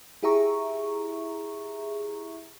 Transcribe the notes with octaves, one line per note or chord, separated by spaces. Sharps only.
E4 G4 G#4 E5 A#5 C#6